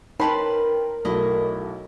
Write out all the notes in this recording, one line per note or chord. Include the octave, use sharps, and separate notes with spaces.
D#4 A#4 B4 C#5 G5 A5 B5 C6
B1 A3 E4 D#5